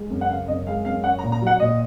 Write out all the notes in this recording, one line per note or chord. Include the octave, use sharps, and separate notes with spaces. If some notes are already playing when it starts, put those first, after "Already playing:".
Already playing: G#3
F#2
F#5
C#3 F5
F#2 D#5
G#3 F5
F#2 F5
C#4 F#5
A#5
A#2
A#5
F#3
F#5
A#2 D#5